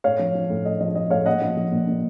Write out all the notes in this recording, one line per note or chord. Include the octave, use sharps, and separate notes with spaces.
A2 C#5 F5
F3
F3
A2
A2 D#5
F3 D#5
F3 D#5
A2 C#5 F5
A#2 D#5 F#5
F3
F3
A#2
A#2